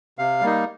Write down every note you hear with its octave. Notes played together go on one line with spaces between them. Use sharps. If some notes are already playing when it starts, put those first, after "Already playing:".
C3 F5
G3 A#3 D#4